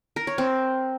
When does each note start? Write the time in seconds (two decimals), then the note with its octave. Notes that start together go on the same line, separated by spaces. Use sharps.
0.16 A#4
0.27 C#5
0.38 C4